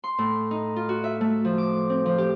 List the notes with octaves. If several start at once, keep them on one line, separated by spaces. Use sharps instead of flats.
C6
A2
D#4
F4
F#4
E5
A3
F3
D6
C4
F3
G4